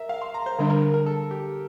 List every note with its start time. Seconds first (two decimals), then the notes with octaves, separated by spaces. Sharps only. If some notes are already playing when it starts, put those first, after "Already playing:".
Already playing: A#4 E5
0.09 F5
0.22 C6
0.34 A#5
0.46 C5
0.59 D3 G3 D4
0.70 A#4
0.82 A#4
0.94 A#4
1.06 A4
1.31 G4